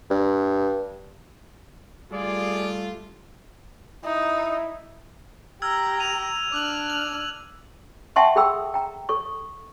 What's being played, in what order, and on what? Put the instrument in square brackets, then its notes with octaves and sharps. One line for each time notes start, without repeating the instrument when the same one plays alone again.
[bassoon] G2
[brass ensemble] G3 A3 F4 [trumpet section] G#4 D5
[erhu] D#4 [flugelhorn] E4
[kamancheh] G4 A#5 [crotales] E6 F6 G#6
[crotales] D#7 F7
[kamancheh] D4 F6 [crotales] D6 F#6 F#7
[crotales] F#7
[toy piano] E5 F#5 G5 A5 C6 C#6
G#4 A4 G5 B5 E6
G5 A#5
A4 C#6